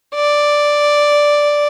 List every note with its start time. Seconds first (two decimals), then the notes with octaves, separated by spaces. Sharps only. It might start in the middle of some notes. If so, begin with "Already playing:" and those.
0.15 D5